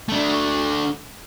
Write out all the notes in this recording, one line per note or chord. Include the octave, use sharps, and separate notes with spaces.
A3 D4